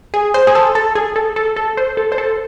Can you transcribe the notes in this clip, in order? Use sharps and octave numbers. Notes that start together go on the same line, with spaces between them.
G#4
C5
G#4
A4
A4
G#4
A4
A4
A4
C5
A4
C5
A4